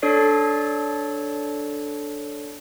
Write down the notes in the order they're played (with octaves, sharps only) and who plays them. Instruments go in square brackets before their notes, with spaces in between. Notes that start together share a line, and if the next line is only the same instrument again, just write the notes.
[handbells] D4 A4 C#5 D5 C7